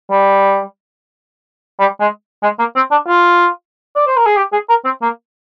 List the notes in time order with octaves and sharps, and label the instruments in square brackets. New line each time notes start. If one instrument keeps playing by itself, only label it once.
[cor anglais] G3
G3
G#3
G#3
A#3
C4
D4
F4
D5
C5
A#4
G#4
G4
G#4
A#4
C4
A#3